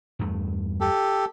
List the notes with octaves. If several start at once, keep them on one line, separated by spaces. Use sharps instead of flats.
E2 G2 A3
G4 A4